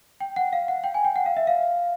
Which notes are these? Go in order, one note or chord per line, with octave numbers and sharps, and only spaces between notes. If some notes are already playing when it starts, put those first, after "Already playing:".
G5
F#5
F5
F#5
G5
G#5
G5
F#5
F5
E5
F5